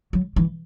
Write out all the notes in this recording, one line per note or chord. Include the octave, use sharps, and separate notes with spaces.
F#3
E3